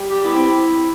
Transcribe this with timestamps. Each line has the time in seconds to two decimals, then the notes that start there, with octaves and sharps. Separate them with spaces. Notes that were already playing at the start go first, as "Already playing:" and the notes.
Already playing: G3
0.09 G4
0.24 B3 E4
0.35 C4